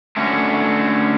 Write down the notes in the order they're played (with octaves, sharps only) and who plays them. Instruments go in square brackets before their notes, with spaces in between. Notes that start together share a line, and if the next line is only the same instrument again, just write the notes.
[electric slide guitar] D3 A3 C#4 F#4